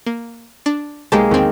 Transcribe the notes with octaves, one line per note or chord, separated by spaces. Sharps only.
A#3
D4
B1 G#3 A#3 C4 G4 A5
E2 D#3 C4